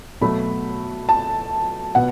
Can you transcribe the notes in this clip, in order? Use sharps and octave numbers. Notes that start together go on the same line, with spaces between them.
B2 F#3 A3 B5
A5
B2 B3 F#5